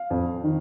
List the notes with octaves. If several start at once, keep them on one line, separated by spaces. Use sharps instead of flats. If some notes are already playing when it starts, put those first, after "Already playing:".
Already playing: F5
F2
D#3